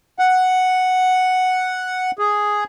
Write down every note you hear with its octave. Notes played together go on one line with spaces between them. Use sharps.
F#5
G#4